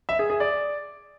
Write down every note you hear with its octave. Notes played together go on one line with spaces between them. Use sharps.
E5
G#4
G#4
D5